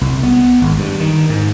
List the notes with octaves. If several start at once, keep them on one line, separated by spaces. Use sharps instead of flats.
C2
B3
G#1
G2
D#3
G#2